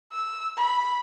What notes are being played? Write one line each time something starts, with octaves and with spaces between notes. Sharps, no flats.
E6
B5